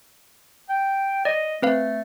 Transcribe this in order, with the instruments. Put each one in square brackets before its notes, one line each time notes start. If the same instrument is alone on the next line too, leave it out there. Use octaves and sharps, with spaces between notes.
[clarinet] G5
[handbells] D5 [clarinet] D#5
[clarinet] A3 [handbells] C4 B4 F5